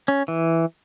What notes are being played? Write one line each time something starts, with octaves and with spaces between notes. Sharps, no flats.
C#4
E3